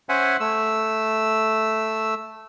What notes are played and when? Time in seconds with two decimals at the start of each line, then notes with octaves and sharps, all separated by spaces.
0.09 C#4 C5 E5 F#5 G#5
0.40 A3 E6